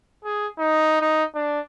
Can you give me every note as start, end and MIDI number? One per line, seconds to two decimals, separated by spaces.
0.24 0.47 68
0.59 1.00 63
1.01 1.24 63
1.35 1.60 62